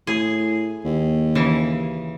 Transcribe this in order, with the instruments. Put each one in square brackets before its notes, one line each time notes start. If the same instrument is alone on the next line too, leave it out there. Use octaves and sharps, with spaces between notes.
[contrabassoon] A2 [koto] G#4
[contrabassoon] D#2
[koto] C#3 E3